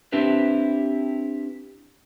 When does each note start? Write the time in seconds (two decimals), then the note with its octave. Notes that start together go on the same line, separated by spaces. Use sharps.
0.12 C4 D4 E4 G4 B4